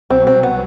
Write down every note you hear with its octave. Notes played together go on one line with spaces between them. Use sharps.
C2 B2 F#3 C4
C4
B3